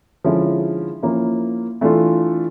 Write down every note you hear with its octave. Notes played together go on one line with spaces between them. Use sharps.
D3 F3 G#3 C#4 E4
F3 A#3 C#4 E4
E3 A3 D4 F4